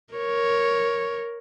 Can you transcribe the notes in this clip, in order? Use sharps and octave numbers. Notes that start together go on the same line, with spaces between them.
A#4 C#5